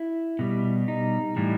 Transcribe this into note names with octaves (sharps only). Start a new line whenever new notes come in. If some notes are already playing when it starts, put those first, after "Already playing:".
Already playing: E4
B2 G3
D#4
A2 E3 G3